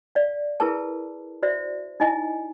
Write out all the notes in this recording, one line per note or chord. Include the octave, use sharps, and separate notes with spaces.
D5 F5
E4 G#4 A#4 B4 A5
F#4 C5 D5 E5
D#4 E4 D#5 G#5